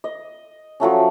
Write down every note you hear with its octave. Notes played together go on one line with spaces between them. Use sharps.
D#5
F3 F#3 A3 C#4